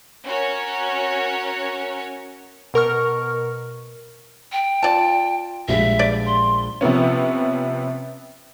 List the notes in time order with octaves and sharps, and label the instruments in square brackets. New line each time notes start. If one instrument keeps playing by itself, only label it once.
[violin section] C#4 F#4 A#4 C#5
[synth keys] B2 A#4 C#6 F6
[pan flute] G5
[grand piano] F4 [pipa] D5 A5
[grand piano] A#1 G3 G#3 [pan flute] E5
[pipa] D5
[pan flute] C6
[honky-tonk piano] C3 F3 B3 C#4